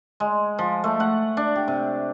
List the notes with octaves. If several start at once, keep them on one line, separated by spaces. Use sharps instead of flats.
G#3
F3
A3
F#5
D4
G4
C3